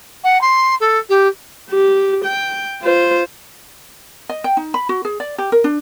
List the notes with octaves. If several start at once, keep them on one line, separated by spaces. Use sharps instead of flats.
F#5
C6
A4
G4
G4
G5
F4 C5
D#5
G5
D#4
B5
F#4
G#4
D5
G4
A#4
D4